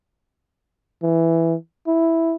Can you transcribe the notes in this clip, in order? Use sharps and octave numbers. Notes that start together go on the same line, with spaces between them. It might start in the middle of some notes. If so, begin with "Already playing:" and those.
E3
E4